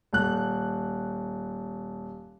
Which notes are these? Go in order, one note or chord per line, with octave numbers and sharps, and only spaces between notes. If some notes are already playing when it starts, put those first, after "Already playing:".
D#1 F#6